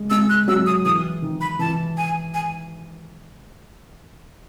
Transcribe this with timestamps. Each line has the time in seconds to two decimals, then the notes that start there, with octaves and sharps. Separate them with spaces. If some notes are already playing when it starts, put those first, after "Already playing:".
Already playing: G#3
0.10 G#3 E6
0.29 F#6
0.48 F#3 E6
0.66 D#6
0.85 E3 D#6
1.22 D#3
1.41 B5
1.59 E3 A5
1.97 G#5
2.34 G#5